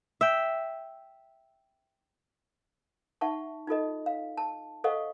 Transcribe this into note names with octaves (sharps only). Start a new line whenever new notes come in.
E5 G5
D#4 E5 F#5 A5 C#6
D#4 F4 A4 D#5
F5
A5
A4 C5 D#5 F5 F#5 C#6